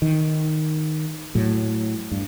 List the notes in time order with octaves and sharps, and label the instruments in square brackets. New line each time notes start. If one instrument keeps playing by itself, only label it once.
[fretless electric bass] D#3
A2 F#3
G2